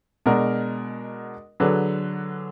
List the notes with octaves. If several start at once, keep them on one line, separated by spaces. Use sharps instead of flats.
B2 G#3 D4 F#4 A#4
D3 F#3 D4 G#4 B4